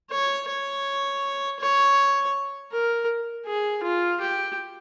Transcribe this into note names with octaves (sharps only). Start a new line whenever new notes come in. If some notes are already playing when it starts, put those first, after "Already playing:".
C#5
C#5
C#5
A#4
G#4
F4
G4